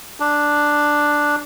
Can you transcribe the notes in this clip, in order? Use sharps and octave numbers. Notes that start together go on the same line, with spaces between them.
D4